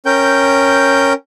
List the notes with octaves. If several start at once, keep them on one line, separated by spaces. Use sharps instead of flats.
C#4 A#4 G5 G6